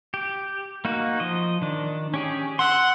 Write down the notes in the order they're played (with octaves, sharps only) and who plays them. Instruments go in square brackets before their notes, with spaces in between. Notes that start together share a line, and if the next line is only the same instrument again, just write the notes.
[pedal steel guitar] G4
A#3 D#4 F#4
F3 D#5
D#3 D4
C#4 G4 G#4
[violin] F#5 [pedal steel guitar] C6 E6